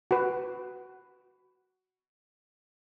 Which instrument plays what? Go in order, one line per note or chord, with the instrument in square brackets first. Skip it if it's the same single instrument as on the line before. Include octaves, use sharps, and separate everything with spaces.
[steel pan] F#4 B4